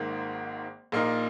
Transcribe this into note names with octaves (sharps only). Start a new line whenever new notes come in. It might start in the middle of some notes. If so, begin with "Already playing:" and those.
Already playing: G#1 G#2 D#3 A#3
A#1 A#2 A#3 D#4